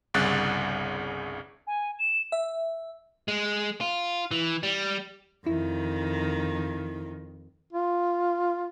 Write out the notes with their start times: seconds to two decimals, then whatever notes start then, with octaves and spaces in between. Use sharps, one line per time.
0.14 G1 C2 C#3 F#6 A6
1.67 G#5
1.99 E7
2.32 E5
3.28 G#3
3.81 F4
4.31 E3
4.63 G3
5.46 F2 D#3 E4
7.73 F4